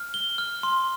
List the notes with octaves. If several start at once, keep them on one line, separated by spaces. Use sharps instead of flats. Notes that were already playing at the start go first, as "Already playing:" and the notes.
Already playing: F6
G7
F6
C6